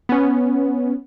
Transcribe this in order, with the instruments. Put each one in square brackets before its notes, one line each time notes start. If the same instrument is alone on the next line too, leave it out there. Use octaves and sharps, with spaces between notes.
[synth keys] B3 C#4